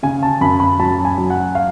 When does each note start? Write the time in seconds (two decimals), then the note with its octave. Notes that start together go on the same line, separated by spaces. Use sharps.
0.03 C#3 G#5
0.23 A5
0.41 F#2 B5
0.60 B5
0.79 F#3 A5
1.05 G#5
1.18 F#3
1.30 F#5
1.55 F5